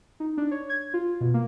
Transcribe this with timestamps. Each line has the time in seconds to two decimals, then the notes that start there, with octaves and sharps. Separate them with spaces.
0.20 D#4
0.38 D4
0.51 C#5
0.69 G#6
0.94 F4
1.21 B2
1.34 A#3